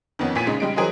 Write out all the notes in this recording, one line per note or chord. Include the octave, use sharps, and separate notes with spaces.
F2 D#3 B3 C#4
A1 A#2 G#5 B6 D#7
C#3 G#3 D#4
C#3 G3 G#3 D#4 D7
E3 F#3 G#4 A#4 C5 D#5